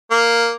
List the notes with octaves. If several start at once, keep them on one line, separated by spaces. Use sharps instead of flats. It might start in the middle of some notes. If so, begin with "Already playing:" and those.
A#3